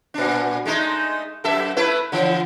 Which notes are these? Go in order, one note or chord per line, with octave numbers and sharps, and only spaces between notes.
A#2 D4
G#3 A3 D#4
F#2 A4 E5
A3 E4 B4
D3 E3